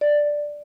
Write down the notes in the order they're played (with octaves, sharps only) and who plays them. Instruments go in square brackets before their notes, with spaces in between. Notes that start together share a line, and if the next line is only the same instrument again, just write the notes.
[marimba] D5